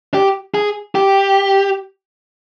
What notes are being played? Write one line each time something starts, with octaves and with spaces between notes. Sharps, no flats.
G4
G#4
G4